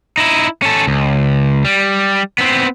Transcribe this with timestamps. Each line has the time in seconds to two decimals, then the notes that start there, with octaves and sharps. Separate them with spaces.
0.17 D#4 E4
0.62 C#4 A4
0.87 C#2
1.65 G3
2.38 B3 C4